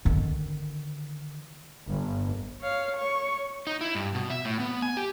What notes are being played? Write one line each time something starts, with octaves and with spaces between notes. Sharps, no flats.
D3 D#3
G1
C#5 F5
C#5 C#6
D#4
E4
G2
B2
E5
A2
B3
G#5
G4